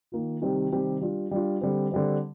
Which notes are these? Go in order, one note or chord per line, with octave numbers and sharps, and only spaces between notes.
D#3 A#3 F4
C3 D#3 G3 C4 G4
C3 D#3 G3 C4 G4
G3 D4 F4
G3 D4 F4
D3 G3 C4
D3 G3 C4